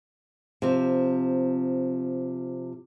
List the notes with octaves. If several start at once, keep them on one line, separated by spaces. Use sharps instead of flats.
C3 F3